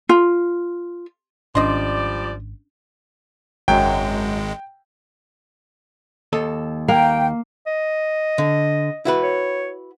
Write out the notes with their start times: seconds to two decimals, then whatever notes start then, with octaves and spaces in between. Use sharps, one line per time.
0.09 F4
1.55 G#1 F3 G3 C#4 D4 D5 D#5 C6
3.68 G#1 F#2 F#3 G#3 G5
6.33 D#2 A4 D#5
6.88 A#3 G5
7.67 D#5
8.38 D3
9.05 E4 F#4 B4
9.23 C#5